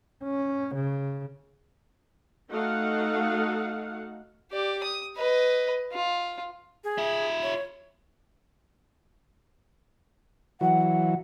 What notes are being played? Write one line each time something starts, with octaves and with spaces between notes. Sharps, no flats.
C#4
C#3
A3 D#4 F#4 A4 F5 F#5
G4 D5
D#6
B4 D#5
F4
G#4
F4 E5
C#5
E3 F#3 F#5